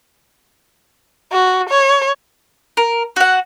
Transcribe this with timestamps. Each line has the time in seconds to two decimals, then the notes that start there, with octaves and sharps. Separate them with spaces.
1.32 F#4
1.69 C#5
2.77 A#4
3.16 F#4 F#5